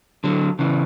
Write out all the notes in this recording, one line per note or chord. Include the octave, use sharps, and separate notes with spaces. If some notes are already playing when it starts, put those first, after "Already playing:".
D3 F#3
C#3 E3